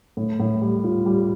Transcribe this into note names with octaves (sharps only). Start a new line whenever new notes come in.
A2
A2
G3
F4
G3